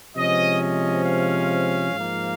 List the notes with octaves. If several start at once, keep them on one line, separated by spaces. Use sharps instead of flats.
C3 F3 G#3 C#4 D#5
D#5
F5
G#2 F3 A#3